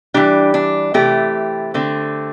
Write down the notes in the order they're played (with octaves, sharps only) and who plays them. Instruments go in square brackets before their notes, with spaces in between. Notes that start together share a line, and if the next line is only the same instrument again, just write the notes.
[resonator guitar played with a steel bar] E3 G3 D4 G4
D4
C3 E3 A3 C4 G4
D3 A3 C4